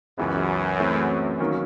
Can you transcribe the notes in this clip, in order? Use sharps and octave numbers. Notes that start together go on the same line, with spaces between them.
C#2 F#2 C#3 E3 G#3 B3
E3 A3 C4 E4 G#4
D#3 F#3 A#3 C#4